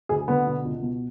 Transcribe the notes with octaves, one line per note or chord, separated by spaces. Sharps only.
D2 G#4
D3 B3
B2
C#2
B2